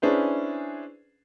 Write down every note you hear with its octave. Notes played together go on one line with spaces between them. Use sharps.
C#4 D4 E4 G#4 B4 C5